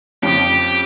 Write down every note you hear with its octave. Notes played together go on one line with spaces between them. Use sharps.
F2 C#3 F3 G4